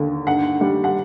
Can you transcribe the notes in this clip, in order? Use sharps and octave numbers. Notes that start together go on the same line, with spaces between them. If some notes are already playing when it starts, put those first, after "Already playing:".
Already playing: D#2 D3
G2 F#5
G3
F#5